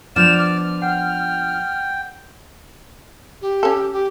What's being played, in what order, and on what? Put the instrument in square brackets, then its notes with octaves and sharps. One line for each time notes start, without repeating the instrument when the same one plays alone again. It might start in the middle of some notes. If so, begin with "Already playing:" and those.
[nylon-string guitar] F3 B3 D4 [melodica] D5 [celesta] F6 G6 F7 [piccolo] E7
[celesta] D6 [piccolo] F6
[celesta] F#5 [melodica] G5
[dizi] G4
[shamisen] C#4 A4
[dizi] G4